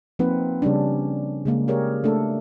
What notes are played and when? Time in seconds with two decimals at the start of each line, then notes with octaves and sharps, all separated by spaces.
0.19 F3 A#3 C4 D#4 B4 F#5
0.62 C#3 G3 C#4 D4
1.46 C#3 G#3 A#3
1.68 G4 G#4 A#4 C#5 D5
2.04 A3 D4 A4